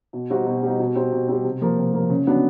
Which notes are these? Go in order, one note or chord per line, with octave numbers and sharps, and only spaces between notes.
B2
G3 C4 D#4 F#4
B2
G3 C4 D#4 F#4
B2
G3 C4
B2
G3 C4
C3
F3 A#3
C3
A#3
F3
C#3
F#3 B3 D4